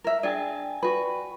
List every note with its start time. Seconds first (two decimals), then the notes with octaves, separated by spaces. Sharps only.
0.04 A#4 E5
0.23 D4 G#4 D5 G5 G#5
0.83 F#4 B4